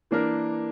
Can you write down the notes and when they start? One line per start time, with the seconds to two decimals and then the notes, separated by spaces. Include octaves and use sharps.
0.11 E3 A#3 D4 A#4